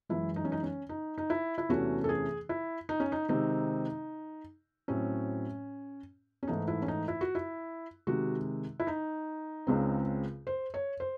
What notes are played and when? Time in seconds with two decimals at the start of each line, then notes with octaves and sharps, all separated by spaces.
0.09 F#2 E3 G#3 E4
0.36 D#4
0.45 C#4
0.52 D#4
0.63 C#4
0.89 D#4
1.18 D#4
1.30 E4
1.58 E4
1.69 E2 C3 E3 A3 C#4 F#4
2.04 A4
2.09 G#4
2.49 E4
2.89 D#4
3.00 C#4
3.12 D#4
3.29 C3 D#3 G#3 C4 D#4
4.88 A2 F#3 C4 C#4
6.43 C#4
6.47 G#2 E3 A3 D#4
6.68 E4
6.82 C#4
6.88 D#4
7.08 E4
7.21 F#4
7.35 E4
8.07 C3 D#3 G#3 F#4
8.80 E4
8.87 D#4
9.67 C#2 C#3 G#3 C4
10.47 C5
10.74 C#5
11.00 C5